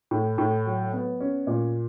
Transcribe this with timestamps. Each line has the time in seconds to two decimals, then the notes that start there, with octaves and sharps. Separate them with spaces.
0.11 A2
0.38 A2
0.66 F#3
0.93 B3
1.20 C#4
1.47 A#2